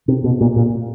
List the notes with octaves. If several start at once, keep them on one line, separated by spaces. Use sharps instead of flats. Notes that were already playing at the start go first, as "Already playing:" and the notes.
C3
B2
A#2
A#2